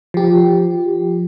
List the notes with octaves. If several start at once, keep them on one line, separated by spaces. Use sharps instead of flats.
F3 G4